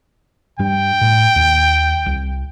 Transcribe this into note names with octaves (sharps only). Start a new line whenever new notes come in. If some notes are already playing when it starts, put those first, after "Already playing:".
G2 G3 G5
A2
D#2
C2